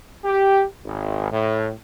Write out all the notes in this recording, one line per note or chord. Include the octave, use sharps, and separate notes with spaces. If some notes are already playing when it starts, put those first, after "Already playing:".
G4
G#1
A2